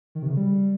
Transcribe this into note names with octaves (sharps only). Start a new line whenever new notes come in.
D#3
C3
C#3
G3